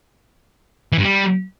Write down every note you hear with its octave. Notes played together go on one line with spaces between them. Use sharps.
E3
G2
G3